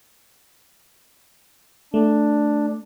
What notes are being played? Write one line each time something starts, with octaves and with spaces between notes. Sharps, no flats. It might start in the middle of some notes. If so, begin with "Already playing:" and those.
A3 D4